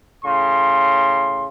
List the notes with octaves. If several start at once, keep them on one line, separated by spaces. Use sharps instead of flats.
A2 C#3 C6